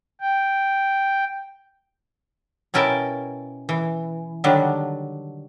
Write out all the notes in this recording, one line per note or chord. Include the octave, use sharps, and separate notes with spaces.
G5
B2 C#4 E4 A#4 G5 A5
E3
D3 D#3 F#3 G3 D4